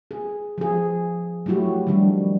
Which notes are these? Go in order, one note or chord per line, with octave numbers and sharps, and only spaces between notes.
G#4
F3 G#4
F#3 A3 E4 F#4 G4
D#3 F3 G3 D4